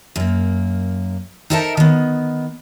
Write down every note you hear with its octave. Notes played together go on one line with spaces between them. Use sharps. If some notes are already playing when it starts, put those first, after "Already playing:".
F#2 A#3
D#4 A4 A#4 C5 E5 A5
D#3 B3